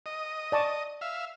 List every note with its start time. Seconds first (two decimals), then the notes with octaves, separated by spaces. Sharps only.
0.06 D#5
0.52 D5 A5 C#6
1.01 E5 F5